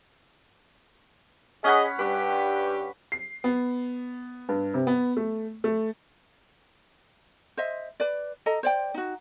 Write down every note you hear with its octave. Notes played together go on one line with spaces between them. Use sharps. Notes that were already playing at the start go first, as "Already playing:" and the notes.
C#4 G#4 D#5 F#5 B5
G2 G4 B4
C7
B3
G2
C3
B3
A3
A3
C5 D#5 E5
B4 D5
A4 D#5 A#5
C5 D5 G5
D#4 F#4